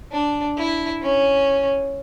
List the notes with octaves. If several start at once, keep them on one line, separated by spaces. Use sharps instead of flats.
D4
E4
C#4